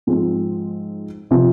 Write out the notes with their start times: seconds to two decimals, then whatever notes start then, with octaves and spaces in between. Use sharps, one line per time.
0.07 G#2 F3 G#3 C4
1.31 C3 F3 C4